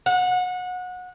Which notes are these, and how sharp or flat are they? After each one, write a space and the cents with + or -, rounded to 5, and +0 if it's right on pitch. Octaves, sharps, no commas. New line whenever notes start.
F#5 -25